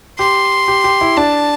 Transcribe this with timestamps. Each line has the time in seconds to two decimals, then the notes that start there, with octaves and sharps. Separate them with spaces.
0.19 G4 C6
0.68 G4
0.84 G4
1.01 E4
1.17 D4 A5